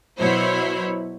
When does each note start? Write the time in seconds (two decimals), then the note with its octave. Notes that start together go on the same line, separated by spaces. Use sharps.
0.19 B2 F#3 E4 C5 C#5 B5